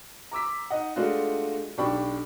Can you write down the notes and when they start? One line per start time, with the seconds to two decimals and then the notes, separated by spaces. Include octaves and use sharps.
0.31 A#5 D6 E6 B6
0.70 D#4 D#5 F#5
0.96 G#3 A3 D4 F4 F#4
1.78 B1 D4 G4 B5 C#6